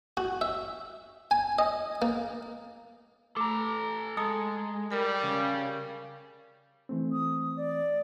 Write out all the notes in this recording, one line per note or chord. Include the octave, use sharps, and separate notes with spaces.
F#4
E5
G#5
D#5
A#3
A3 A4 A#5 D6
G#3 A4 A5 A#5 D#6 C#7
G3 A#4
C#3
E3 A3 C4
D#6
D5